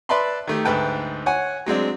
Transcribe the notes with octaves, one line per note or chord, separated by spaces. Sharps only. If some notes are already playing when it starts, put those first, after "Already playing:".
B4 D5 E5 A5 B5 C6
D#3 A3 G4
D2 G#2 B4 G5 A5
C#5 F#5 G#5
F#3 G#3 C4 D4